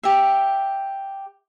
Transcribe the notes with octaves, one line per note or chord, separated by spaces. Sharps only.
G4 E5